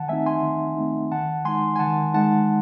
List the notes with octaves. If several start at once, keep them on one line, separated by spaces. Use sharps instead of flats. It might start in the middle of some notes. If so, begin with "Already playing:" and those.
Already playing: D#3 F#5 A5
A3 C4 D#4 E5 G#5
G#5 C6
D#3
A3 C4 D#4
D#3 F#5 A5
G#3 D#4 G#5 C6
G#5
D#3 F#5 A5
G#3 D#4 F#5 A5